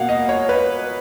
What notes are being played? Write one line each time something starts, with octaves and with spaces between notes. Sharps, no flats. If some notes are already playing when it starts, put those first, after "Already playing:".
Already playing: B2 A#3 F5 F#5
D#5
C#5
B4